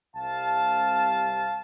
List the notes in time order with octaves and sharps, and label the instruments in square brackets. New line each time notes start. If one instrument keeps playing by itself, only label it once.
[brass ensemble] C2 C3 G3 F5 A5